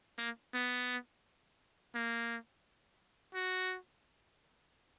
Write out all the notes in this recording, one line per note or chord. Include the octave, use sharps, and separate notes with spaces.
A#3
B3
A#3
F#4